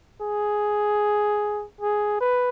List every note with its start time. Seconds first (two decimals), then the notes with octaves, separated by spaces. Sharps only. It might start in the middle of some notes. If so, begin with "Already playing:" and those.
0.21 G#4
1.81 G#4
2.21 B4